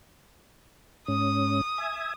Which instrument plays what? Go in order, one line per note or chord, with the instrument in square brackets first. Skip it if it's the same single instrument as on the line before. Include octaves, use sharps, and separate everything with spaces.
[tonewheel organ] G#2 C#4 [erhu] D#6
[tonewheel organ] E5 G#5